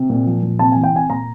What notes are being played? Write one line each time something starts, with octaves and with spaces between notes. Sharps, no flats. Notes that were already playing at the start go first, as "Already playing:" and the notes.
Already playing: C3
A#2
F3
A#2
C3 A5
E3 G#5
G5
C3 G#5
A#2 A#5